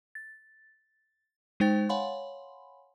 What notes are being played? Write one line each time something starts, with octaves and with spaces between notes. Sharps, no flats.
A6
G#3 D#4 C5 G5 A6
C#5 F5 F#5 G#5 B5 C6